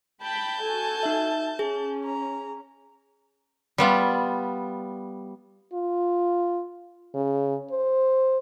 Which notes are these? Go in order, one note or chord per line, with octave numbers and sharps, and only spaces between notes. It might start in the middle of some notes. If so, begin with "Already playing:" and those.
G5 A5 B5 G6
F#4 A4 G#5
D#4 E5
C#4 G#4
A#5
G3 B3 F4
F4
C#3
C5